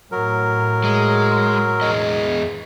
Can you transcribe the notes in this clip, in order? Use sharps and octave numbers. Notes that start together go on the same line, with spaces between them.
A2 F#3 A#4
G#3
E2 G#4 D#5